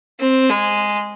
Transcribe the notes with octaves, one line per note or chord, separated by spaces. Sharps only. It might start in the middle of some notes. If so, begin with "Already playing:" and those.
C4
G#3